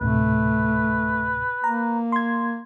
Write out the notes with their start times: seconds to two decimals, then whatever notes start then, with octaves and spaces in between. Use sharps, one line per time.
0.01 D2 A2 C3 A3 B4
1.64 A#3 A#5
2.12 C6 G#6